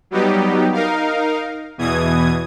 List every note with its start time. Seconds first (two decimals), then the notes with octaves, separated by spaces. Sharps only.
0.11 F#3 G3 B3 D#4 G4
0.73 D#4 A#4 F5
1.78 E2 B2 E3 D#6 G#6